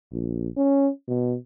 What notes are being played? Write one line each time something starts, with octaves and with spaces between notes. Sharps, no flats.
A#1
C#4
B2